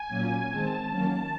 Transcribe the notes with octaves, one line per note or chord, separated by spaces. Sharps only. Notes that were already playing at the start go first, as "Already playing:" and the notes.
Already playing: G#5
A#2 F#3 A#3 C#4
D#3 G#3 C4 A5
D#3 F#3 A#3 C#4